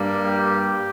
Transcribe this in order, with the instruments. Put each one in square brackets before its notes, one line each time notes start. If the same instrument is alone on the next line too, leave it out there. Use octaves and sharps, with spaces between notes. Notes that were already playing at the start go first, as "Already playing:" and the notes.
Already playing: [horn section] G2 G3 A#3
G4